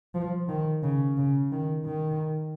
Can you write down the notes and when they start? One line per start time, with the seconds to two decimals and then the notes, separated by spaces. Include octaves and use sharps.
0.14 F3
0.49 D#3
0.83 C#3
1.17 C#3
1.52 D#3
1.86 D#3